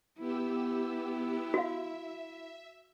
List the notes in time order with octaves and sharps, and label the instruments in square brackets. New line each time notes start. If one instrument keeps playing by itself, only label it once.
[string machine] B3 G4 E6 [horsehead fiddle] E4
[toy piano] F#4 F5 [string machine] E5